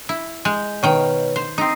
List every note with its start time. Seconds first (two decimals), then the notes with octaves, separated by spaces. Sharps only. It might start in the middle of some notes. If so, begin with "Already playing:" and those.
0.09 E4
0.45 G#3 G6
0.83 B2 D#3 B4 C#5 G5
1.36 C5
1.58 C4 D#4 D#6 A#6 C7